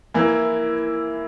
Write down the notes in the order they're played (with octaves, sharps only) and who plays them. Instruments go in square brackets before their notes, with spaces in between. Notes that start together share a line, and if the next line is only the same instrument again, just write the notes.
[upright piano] E3 A#3 E4